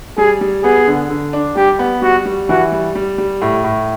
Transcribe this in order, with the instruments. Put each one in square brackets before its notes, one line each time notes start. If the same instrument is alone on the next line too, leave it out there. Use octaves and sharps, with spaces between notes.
[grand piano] G3 [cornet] G#4
[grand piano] G3
[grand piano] B3 [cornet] G#4
[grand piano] D3
D3
D4
[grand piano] G3 [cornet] G4
[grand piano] B3
[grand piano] G3 [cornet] F#4
[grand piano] G3
[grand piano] E3 [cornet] F#4
[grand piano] G3
G3
G3
A2
A2